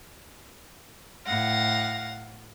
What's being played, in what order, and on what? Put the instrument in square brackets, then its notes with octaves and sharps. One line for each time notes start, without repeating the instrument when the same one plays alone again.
[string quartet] A2 F5 F#5 A#6